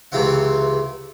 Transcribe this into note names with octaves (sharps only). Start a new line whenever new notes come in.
C#2 C3 E3 C4 F#5